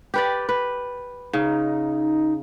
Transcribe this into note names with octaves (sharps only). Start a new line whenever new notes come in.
G4 B4 D5
B4
C#3 D#4